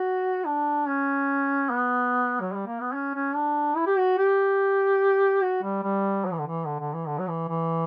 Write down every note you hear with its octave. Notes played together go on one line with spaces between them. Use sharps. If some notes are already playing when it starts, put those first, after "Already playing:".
Already playing: F#4
D4
C#4
B3
F#3
G3
A#3
B3
C#4
C#4
D4
E4
G4
F#4
G4
F#4
G3
G3
F#3
E3
D3
E3
D3
D3
E3
D3
F#3
E3
E3